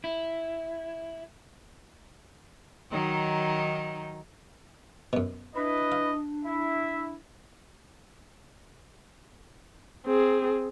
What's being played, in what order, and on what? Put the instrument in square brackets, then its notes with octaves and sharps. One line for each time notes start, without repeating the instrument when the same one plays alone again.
[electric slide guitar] E4
[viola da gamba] D#3 F#3 D#4
[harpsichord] F#2 B2
[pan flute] D4 [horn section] E4 B4 [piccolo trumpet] D#5
[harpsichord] F5
[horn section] E4 [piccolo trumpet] E5
[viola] C4 G#4